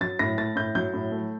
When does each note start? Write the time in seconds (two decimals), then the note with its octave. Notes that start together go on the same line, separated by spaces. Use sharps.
0.01 F#3 A6
0.19 A2 A#6
0.37 A3 A6
0.56 A2 G6
0.75 F#3 G6
0.94 A2
1.12 A3